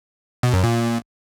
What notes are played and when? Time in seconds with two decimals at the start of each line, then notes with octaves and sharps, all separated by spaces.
0.43 B2
0.53 F#2
0.63 A#2